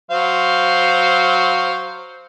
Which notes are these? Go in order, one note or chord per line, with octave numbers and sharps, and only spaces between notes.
F#3 C5 F5